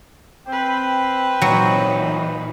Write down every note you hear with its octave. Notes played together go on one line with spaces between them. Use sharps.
C4 B4 C5 G5
A#2 E3 F#3 D#4